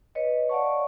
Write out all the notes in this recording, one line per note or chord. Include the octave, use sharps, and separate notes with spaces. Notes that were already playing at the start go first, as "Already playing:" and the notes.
B4 C#5 D#5
D5 F5 F#5 A5 C#6